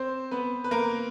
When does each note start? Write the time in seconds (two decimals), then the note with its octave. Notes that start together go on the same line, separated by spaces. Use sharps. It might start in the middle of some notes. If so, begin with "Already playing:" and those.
Already playing: C4 C5
0.31 B3 B4
0.64 B4
0.71 A#3 A#4